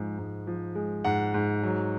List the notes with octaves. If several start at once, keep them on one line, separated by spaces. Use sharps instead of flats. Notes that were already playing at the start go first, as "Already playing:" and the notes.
Already playing: G#2 F3 G#3
G#2
F3
G#3
G#2 F#5
G#2
F#3